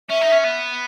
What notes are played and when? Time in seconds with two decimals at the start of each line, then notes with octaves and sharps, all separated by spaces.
0.10 C#4 E5
0.22 D#4
0.32 C#4
0.44 B3